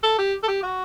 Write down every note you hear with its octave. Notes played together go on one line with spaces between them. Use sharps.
A4
G4
A4
G4
F#4